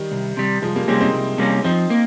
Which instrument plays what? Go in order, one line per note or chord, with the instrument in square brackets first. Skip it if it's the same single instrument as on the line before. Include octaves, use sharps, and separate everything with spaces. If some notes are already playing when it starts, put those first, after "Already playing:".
Already playing: [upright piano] D#3 G3
[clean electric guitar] C2
C3 G3
[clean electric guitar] C2 [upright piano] F3 G#3
[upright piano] G3 A#3
[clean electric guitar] C3 G3 A#3 C#4 [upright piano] G#3 C4
[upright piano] C4 D#4
[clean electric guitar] C2
C3 G3 A#3 C#4
[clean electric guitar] F3 [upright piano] C4 D#4
[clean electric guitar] A#3